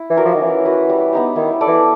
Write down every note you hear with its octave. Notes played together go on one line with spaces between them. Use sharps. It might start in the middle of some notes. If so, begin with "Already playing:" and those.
Already playing: E4
E3
F#4 A#4 D5
F3
D#3
E3 C#4
F#4 B4
G3
B3 D#4 G4
D#3 E4
A4 D5
E3